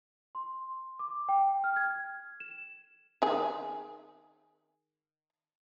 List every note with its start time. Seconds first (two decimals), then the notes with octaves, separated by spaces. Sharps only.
0.35 C6
0.99 D6
1.29 G5
1.64 F6
1.76 G#6
2.40 E7
3.22 D#3 G#4